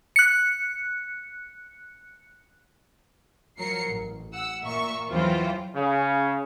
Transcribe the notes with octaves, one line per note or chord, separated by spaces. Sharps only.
F#6 C#7
F3 F#3 A#4 C7 C#7
A1
F#5 E6
A#2 A#4 E5 C#6
E2 E3 F#3 F4 C5 G5
C#3